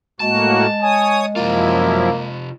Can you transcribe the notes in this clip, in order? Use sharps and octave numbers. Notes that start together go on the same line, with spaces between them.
A2 G#3 A#3 F#4 A5
C#5 G#5 D#6
F#2 C3 F3 A#3 E4 F4